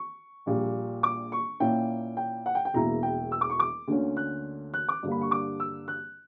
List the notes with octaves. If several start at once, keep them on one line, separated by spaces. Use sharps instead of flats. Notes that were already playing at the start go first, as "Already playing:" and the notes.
Already playing: C#6
A#1 A#2 G3
D6
C#6
A#2 A#3 C#4 E4 G5
G5
F#5
G5
G5
E1 E2 B2 A#3 E4 A#5
G5
E6
D6
C#6
D6
D2 D3 A#3 C#4
F#6
F#6
D6
G2 D3 G3 A#3
B5
C#6
D6
E6
F#6